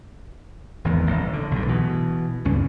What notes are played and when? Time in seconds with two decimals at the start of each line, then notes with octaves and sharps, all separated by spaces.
0.84 G#1 E2
1.07 A1 A2
1.33 D3
1.51 B1 G2
1.67 B2 E3
2.45 C#2 G2 C#4